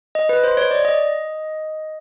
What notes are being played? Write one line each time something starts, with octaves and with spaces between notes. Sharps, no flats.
D#5
B4
C5
C#5
D5
D#5